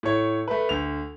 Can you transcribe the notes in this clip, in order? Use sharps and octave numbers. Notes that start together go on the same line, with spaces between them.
A2 C#5
A3 B4
D2 F7